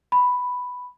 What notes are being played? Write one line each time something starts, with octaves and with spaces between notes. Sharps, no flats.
B5